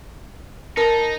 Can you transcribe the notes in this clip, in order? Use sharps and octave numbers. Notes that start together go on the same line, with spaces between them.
D#4 A#4 A5